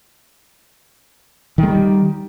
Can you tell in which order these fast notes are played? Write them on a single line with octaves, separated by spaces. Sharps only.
D#3 G#3 G3